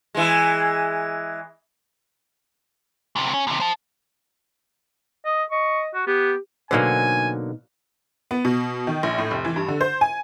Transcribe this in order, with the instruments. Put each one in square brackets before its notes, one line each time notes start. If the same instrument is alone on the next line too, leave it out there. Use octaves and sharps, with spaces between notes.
[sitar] E3 G#3
[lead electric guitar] D2 C3
C#4
D#2 C3
C5 A5
[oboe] D#5
[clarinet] D#5 [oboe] C#6
[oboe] F#4
[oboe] B3 [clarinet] G4
[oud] B2 D#4 C5 [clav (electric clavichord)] D3 F#3 A#3 [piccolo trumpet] G#5
[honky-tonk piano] B3
B2
D#3
A#1
A2
F1
E3
G2
D3
C5
G#5